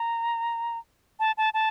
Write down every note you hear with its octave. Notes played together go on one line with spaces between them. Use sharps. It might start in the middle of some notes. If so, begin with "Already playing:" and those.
Already playing: A#5
A5
A5
A5